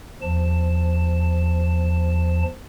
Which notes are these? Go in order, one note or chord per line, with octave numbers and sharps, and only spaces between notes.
E2 F3 A5